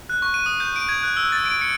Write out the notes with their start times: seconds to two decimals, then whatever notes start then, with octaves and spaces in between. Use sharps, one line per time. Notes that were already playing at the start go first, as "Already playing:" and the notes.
0.09 F#6
0.22 C#6
0.34 D#7
0.46 D#6
0.60 G6
0.76 D7
0.89 G#6
1.03 F#6
1.17 E6
1.32 A6
1.45 D7
1.61 C#7